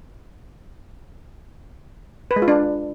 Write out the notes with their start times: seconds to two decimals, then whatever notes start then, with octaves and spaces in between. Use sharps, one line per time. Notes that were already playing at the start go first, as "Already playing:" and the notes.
2.31 B4
2.36 G#3
2.42 F4
2.48 D4